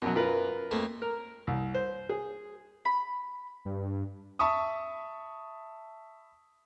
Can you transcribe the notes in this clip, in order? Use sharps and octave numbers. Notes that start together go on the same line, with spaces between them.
F#2 B2 F#3
F4 A#4 B4
F2 A3 A#3
A#4
C2
C5
G#4
B5
G2
E5 A5 B5 C#6 D#6